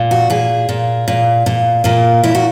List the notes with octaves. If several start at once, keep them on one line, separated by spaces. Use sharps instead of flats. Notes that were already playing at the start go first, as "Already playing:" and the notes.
Already playing: A#2
F#4
A#2 G#4
A#2
A#2
A#2
A#2 A#3
A#2 E4
F#4